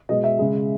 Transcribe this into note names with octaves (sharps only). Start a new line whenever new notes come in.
B2 G#3 D#5
E5
C#3 G#3